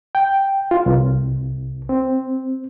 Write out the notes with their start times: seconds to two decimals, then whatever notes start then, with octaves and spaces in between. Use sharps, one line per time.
0.15 G5
0.71 F4
0.86 C2
1.89 C4